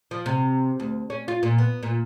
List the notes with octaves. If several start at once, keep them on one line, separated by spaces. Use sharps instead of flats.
F3
C3
D2
C#4
F4
A#2
B3
A#2